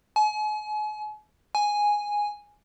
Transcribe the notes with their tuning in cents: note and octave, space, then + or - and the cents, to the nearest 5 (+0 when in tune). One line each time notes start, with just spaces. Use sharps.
G#5 +40
G#5 -5